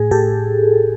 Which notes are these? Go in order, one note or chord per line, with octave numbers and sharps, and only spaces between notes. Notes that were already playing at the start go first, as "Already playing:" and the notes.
Already playing: A2 G#4
A2 G4 A4